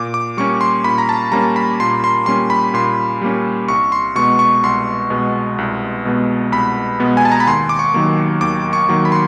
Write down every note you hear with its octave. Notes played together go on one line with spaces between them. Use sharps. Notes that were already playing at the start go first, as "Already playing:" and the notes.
Already playing: A#2 D6
D6
G3 A#3 C#4 C#6
C6
A#2 B5
A#5
A5
G3 A#3 C#4 A#5
B5
A#2 C6
C6
G3 A#3 C#4 C6
B5
A#2 C6
G3 A#3 C#4
C2 C#6
C6
B2 G#3 B3 C#6
C#6
C2 C6
B2 G#3 B3
C2
B2 G#3 B3
C2 B5
B2 G#3 B3
G#5
A5
A#5
B5
D#2 C6
D6
C#6
D#3 F#3 A#3
D#2 D6
C#6
D#3 F#3 A#3
B5
C6